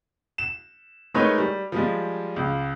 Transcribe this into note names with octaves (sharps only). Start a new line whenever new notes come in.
E7
G#3 A3 D#4 A#4 B4 C#5
G3
F3 G3 G#3
C#2